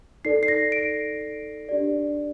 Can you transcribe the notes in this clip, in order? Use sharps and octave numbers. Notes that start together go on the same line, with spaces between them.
D#4 A4 D5 C7
C7
A#6
D7
D4 G4 D5